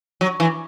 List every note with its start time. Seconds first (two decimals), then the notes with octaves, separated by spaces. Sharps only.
0.21 F#3
0.40 E3